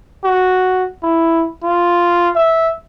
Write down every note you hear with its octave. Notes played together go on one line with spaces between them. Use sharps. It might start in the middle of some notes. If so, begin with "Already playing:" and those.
F#4
E4
F4
E5